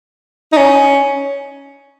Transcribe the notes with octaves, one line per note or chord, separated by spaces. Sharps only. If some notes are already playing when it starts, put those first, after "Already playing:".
D#4
C#4